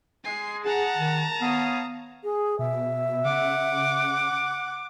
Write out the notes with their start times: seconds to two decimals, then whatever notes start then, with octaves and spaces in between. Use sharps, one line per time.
0.24 G#3 G#5 C7
0.65 G#4 F#5 A5 A#5
0.98 D#3
1.41 B3 C#5 F5 D#6
2.24 G#4
2.59 B2 E5
3.25 C#3 F#5 D6